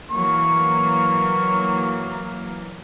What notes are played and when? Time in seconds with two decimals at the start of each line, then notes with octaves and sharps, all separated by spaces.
0.11 E3 F#3 A#3 C#6